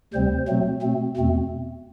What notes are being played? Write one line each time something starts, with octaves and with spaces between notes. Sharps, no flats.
D2 C3 G3 C4 C5
B2 F#3 A3 C4
B2 A3 C4
E2 B2 A3 C4